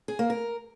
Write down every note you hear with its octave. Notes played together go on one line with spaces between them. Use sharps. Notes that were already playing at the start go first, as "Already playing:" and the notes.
G#4
A#3
A#4